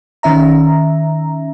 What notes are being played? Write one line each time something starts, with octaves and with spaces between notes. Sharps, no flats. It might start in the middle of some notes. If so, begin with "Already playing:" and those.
D#3 C#4 E5 A#5